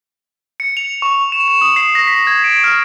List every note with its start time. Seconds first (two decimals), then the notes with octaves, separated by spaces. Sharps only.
0.60 C#7
0.77 F7
1.02 C#6
1.32 E7
1.48 E7
1.61 D#6
1.76 C7
1.95 A#6
2.07 B6
2.27 G#6
2.44 D7
2.64 F6